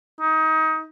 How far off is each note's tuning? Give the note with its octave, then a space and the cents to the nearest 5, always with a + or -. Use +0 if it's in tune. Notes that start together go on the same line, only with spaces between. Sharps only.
D#4 +25